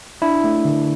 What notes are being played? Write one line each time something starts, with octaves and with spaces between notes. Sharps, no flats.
D4 E4
A3
D3